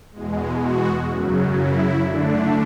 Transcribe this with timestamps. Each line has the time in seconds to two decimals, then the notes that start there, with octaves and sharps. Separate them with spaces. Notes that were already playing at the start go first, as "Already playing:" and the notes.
0.12 E2 B2 G#3
0.60 F#4
1.08 F#2 C#3 F#3
1.54 E4
2.01 D3 A3 D4